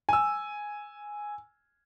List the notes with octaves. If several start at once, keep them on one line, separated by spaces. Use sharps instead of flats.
G#5 E6